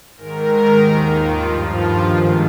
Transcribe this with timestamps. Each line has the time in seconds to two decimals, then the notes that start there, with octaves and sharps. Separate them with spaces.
0.17 G#2 D#3 A#4
0.78 D#2 D#3 G4
1.09 F4
1.40 G2 F3 G4
1.70 F4
2.00 G#2 D#3